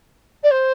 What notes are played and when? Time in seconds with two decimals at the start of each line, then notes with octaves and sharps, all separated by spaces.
0.43 D5
0.50 C5